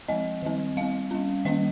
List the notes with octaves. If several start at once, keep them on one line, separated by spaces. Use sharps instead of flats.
F3 G#3 C4 D#5
D#3 G3 C4
G3 C4 F5
G3 C#4
D#3 G3 A#3 C#4 D#5